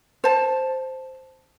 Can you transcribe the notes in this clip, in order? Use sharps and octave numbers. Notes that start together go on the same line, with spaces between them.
C5 A5